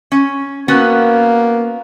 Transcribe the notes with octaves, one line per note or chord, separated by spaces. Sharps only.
C#4
A#3 B3 C#4 F#4